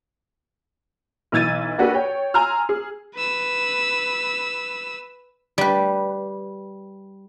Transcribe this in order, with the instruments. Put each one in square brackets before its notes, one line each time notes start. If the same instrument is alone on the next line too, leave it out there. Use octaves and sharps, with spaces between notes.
[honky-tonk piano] B1 E3 E6 G#6 A6 D#7
A#3 D4 F#4 G4 A4 B4
C#5 G5
G#5 A#5 C6 E6 F6
G#4
[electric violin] B4 E6
[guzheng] G3 B4